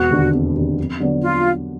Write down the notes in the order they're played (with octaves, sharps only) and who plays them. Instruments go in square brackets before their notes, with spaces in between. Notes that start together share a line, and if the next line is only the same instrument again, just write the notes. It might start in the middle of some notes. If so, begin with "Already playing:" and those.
Already playing: [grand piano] E1 [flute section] F#4
[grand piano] D#2 D3
E1
D#2 D3
F2
D3 F#3 B3 D4
[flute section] F4